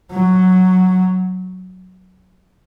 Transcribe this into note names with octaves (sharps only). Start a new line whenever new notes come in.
F#3